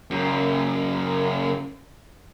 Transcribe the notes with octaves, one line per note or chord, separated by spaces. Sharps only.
F#2 C#3